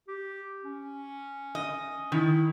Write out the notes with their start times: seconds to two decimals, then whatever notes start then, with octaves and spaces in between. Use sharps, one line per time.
0.08 G4
0.64 C#4
1.55 D#5
2.12 D#3 E4